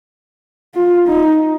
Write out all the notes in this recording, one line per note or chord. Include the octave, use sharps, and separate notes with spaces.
F4
D#4